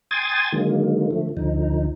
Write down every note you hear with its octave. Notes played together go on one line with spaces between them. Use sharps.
G5 G#5 C6 D#6 G#6 A6
D3 D#3 F#3 G#3 A#3
D3 F3 A3
D2 D3 F3 D#4